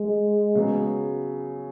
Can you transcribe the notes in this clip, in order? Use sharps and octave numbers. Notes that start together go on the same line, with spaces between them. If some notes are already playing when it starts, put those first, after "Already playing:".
Already playing: G#3
C#3 F#3 B3